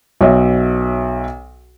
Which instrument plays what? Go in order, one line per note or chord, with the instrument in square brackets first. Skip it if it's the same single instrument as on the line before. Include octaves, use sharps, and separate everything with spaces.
[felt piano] B1 C#5 E5